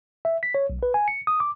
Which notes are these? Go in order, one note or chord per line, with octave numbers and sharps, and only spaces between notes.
E5
B6
C#5
B1
B4
G#5
C#7
D#6
D6